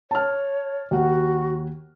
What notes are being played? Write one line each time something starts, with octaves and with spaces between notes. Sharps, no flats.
C#5 A5 F6
D#2 F#4 F#5